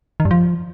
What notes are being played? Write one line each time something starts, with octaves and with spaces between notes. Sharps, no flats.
D#3
G2
F3